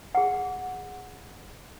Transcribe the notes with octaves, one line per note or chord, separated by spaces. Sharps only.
G#4 F#5